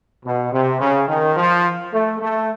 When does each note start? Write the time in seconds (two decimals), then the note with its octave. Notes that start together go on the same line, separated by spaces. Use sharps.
0.25 B2
0.52 C3
0.80 C#3
1.09 D#3
1.37 F3
1.92 A3
2.20 A3